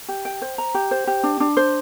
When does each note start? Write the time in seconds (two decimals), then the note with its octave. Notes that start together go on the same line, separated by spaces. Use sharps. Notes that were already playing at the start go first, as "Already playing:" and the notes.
0.08 G4
0.25 G5
0.42 C5
0.58 A#5
0.74 G4
0.91 C5
1.07 G4
1.23 D4
1.40 D4
1.57 C5